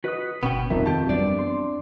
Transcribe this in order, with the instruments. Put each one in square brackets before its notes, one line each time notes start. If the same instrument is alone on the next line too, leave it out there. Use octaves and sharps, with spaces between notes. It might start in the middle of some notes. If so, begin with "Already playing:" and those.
[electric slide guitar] F#4 B4 D#5 [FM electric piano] D#6 F#6 B6
[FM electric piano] G1 [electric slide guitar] B2 [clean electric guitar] B3 C#4 G5
[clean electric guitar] C2 [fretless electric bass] F2 F3 [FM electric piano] C4 D#4 A#4 [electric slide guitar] E5
[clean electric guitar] D#3 G4 [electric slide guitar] C4 [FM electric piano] A5
[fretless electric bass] F#2 [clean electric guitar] E3 D4 D5 [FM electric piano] G3 B3
[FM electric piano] C6